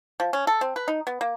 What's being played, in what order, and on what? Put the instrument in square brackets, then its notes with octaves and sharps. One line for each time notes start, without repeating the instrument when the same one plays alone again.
[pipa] F3
C#4
A4
C4
B4
D#4
B3
A#3